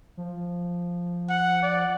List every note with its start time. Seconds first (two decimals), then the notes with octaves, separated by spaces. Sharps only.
0.17 F3
1.29 F#5
1.62 D5